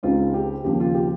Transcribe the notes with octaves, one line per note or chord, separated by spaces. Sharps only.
C#2 C#3 G#3 C4 D#4 F4
G4
D#2 C#3 F3 C4 G4
F4
G4